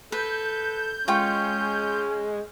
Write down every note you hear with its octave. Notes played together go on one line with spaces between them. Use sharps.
A4 B4 G6
G#3 C#4 F4 G5 C#6